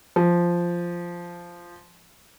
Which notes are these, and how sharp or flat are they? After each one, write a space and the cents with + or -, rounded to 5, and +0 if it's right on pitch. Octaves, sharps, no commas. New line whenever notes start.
F3 -5